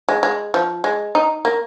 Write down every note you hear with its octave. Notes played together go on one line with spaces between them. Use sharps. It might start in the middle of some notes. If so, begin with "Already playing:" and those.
G#3
G#3
F3
G#3
D#4
A#3